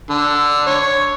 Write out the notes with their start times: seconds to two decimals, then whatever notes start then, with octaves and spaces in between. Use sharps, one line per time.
0.10 D3
0.66 C#5